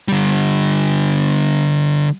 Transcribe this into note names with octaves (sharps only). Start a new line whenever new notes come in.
D3 G3